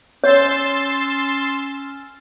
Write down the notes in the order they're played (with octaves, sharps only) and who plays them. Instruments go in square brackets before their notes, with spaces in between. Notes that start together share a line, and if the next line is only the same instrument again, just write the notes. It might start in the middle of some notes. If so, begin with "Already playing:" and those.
[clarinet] C#4 [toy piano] C#5 [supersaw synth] C6 E6 A6